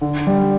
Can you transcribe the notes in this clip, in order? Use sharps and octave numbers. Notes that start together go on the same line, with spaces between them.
D3
G3